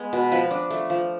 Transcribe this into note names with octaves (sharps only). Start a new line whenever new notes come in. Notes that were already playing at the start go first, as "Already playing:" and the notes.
Already playing: G#3 B3
B2
F3 B4
D4
A3
F3